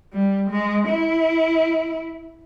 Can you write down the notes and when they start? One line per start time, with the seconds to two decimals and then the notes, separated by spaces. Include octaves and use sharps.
0.13 G3
0.50 G#3
0.89 E4